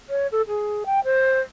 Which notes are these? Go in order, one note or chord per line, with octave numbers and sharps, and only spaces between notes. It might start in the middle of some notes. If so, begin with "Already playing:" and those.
C#5
A4
G#4
G5
C5